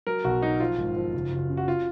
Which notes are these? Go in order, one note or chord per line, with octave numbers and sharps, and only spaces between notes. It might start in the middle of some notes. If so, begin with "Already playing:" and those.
F#3 A#4
B1 F#4
F#3 D#4
F3 F4
G#1
F3
F#1
F#1
C#3
F#4
F4